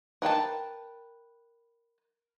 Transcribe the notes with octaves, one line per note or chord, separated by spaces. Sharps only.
A#4 B4 G5 A5